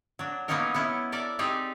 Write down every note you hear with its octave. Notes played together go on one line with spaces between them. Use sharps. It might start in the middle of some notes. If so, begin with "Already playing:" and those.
F#3 D4
F#3 A#3 B3 C#4 D#4 A#4
B3 C#4 E4
A4 A#4 D5 E5
C4 D#4 G4 G#4 D5